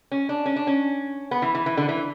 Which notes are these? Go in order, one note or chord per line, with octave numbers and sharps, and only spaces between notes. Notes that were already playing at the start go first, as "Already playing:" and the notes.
C#4
D4
C#4
D4
C#4
B3
E3
E3
E3
D3
E3